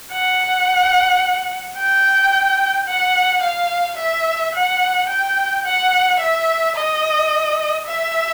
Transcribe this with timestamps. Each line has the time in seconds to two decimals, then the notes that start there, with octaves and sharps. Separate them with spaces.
0.12 F#5
1.78 G5
2.88 F#5
3.43 F5
3.98 E5
4.55 F#5
5.09 G5
5.65 F#5
6.20 E5
6.76 D#5
7.87 E5